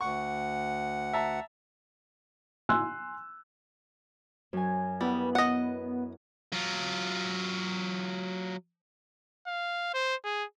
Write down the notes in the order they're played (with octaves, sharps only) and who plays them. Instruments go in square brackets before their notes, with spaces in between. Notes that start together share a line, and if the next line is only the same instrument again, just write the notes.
[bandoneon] D2 F#5 [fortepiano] C#6
[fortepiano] E5 A5 A#5
[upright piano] G#5 C6 E6 F#6
[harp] F#2 G#5
[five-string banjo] G3 [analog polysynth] B3 [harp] E4
[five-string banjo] D#5 F#5 [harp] F#6
[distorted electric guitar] F#3 F4
[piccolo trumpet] F5
C5
G#4